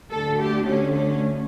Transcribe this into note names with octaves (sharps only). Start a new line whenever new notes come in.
D2 D3 A3 A4
G4
C#4
C#4